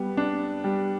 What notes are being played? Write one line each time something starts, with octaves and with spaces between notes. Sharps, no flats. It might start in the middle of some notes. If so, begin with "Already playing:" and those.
Already playing: G3 B3
D4
G3